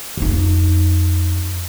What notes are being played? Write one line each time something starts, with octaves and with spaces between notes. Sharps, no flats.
F2 D#4